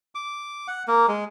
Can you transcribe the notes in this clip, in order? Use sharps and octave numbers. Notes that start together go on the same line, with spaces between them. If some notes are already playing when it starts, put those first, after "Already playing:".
D6
F#5
A#3
G#3